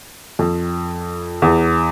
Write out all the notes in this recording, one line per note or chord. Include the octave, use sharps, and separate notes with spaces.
F2
E2